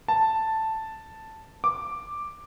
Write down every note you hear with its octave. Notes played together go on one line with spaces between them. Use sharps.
A5
D6